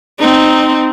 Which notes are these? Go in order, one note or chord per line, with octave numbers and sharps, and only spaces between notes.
C4 D#4